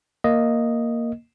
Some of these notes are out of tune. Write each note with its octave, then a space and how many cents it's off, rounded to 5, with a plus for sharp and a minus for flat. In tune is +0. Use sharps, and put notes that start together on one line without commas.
A#3 +0 D#5 +0